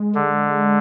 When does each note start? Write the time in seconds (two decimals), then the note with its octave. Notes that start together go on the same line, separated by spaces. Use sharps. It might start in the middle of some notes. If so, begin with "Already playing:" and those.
Already playing: G#3
0.15 D3